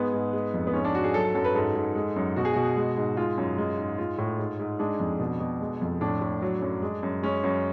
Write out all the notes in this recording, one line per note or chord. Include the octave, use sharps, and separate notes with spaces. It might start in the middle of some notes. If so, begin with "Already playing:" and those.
Already playing: G#2 G#3 B3
G#2
G#3
F2
B3
G#2 C#4
D4
G#2 F#4
G#4
F#3 A4
A4
F#2 A4
B4
G#2 A4
G#2
G#3
F#2
B2 F#4
G#4
B2 F#4
G#3
G#2
G#3 F4
F#2
G#3
G#2
G#3 F4
A2
G#2
G#2
G#3 D4
F2
B2
B2
G#3
F2
A2 D4
A2
F#3
F#2
G#3
F#2
G#3 C#4
F#2